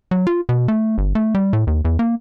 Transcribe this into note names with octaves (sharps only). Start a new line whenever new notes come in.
F#3
F4
B2
A3
G1
A3
G3
A2
D#2
E2
A#3